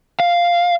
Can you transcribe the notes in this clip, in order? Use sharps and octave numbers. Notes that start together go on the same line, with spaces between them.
F5